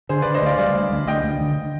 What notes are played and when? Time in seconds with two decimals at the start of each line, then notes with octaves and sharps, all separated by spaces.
0.09 D3 G#4 C5
0.22 D3 B4 D5
0.34 C5 D#5
0.42 D2 D5 F5
0.59 G3 D5 F5
0.75 D2
0.92 D2
1.07 D2 D#5 G5
1.24 D2
1.41 D3